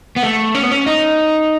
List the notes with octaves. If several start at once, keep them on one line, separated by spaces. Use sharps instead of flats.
B3
A3
C#4
B3
C#4
D#4